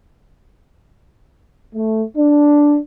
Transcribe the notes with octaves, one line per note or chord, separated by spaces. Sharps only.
A3
D4